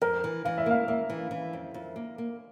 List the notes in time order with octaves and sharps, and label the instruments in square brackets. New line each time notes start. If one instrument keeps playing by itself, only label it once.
[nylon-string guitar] F2 [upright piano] A#4
[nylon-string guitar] E3
[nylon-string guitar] E3 [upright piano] F5
[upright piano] E5
[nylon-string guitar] A#3 [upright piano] F5
[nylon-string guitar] A#3 [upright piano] E5
[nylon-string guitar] E3
E3
F2
F2
A#3
A#3